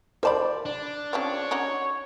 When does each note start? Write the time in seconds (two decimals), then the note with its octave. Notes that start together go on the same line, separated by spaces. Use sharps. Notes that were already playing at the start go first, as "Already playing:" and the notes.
0.23 A#4 C5 D5 A5 B5
0.66 D4
1.13 C#3 F3 C4 C#5
1.51 C#4 D#4 F#4